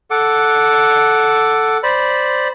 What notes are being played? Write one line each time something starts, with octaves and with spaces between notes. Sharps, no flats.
A4 F#5 D6
C5 D5 B5